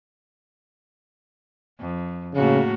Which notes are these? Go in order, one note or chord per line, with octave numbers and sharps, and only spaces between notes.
F2
A2 C#3 A#3 F#4